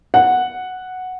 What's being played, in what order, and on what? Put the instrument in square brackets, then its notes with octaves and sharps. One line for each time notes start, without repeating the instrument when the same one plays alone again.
[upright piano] F#5